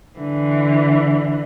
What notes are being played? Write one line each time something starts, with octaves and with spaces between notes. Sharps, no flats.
D3 E3